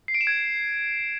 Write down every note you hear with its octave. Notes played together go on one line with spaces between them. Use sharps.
C7
D7
E7
G#6